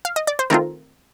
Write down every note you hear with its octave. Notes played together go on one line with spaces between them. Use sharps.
F5
D#5
D5
C5
D#3 A3 C4 F4 A#4